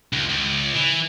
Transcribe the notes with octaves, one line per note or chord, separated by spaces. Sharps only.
C#2
C#2
E3